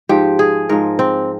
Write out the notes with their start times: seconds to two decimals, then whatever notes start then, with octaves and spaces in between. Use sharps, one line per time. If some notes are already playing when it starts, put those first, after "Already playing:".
0.09 G#2 F3 G4
0.39 G#4
0.69 G#2 F3 A#4
0.99 C4